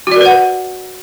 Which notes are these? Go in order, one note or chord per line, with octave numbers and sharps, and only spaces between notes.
F#4 A#4 B4 D5 F#5